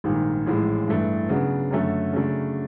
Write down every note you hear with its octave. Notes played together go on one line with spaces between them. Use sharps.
A#1 G#2 D#3 G3
A1 A2 F3 G#3
G2 E3 A3 D4
C#3 F#3 B3 D4
F#2 D3 F#3 A3
C#3 F#3 A3 D4